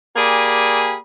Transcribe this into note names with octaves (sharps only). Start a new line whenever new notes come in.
A#3 G4 G#4 D5 G#5 B5